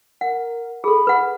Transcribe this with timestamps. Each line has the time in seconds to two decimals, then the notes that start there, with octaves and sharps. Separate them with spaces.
0.21 A#4 F#5
0.84 G#4 A4 B5
1.07 B4 F#5